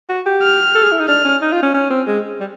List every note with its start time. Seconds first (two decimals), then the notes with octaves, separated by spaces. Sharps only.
0.09 F#4
0.26 G4
0.43 F6
0.75 A4
0.83 G#4
0.92 E4
1.00 D#4
1.08 D4 F6
1.25 C#4
1.42 D#4
1.52 F4
1.63 C#4
1.74 C#4
1.90 C4
2.07 G#3
2.40 G3